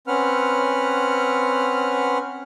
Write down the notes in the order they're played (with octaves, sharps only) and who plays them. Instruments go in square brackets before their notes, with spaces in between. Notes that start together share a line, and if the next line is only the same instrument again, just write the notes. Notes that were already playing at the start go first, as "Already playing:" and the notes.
[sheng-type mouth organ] C4 C#4 B4 F#5 F6